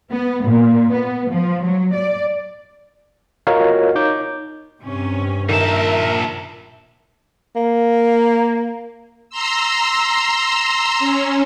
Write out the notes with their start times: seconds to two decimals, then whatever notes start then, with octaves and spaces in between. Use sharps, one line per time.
0.12 B3
0.45 A#2
0.92 B3
1.31 F3
1.63 F#3
1.95 D5
3.47 F4 F#4 A#4 C#5 D#5 F5
3.95 D#4 C#5 D6 G6
4.82 G2 C3 C#4
5.49 A#2 D#3 A#4 E5 A5
7.56 A#3
9.30 A#5 C6 E6
10.99 C#4